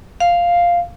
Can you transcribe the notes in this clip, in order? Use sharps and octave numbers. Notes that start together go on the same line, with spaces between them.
F5